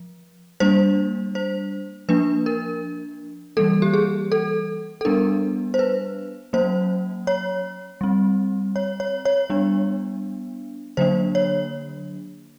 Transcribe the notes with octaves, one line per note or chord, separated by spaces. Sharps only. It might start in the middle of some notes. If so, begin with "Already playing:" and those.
Already playing: F3
G3 A#3 D4 C5
C5
F3 A#3 D4 B4
A#4
E3 G3 A#3 A4
G4
G#4
A4
A4
G3 B3 D4 A#4
C5
B4
F#3 A#3 C#4 C5
C#5
G3 C4
C#5
C#5
C#5
G3 B3 D4
D3 F#3 A#3 D4 C5
C#5